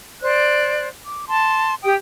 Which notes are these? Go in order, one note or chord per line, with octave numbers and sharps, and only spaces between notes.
C5 D5 F#6
D6
A5 C6
G4 G5 D#6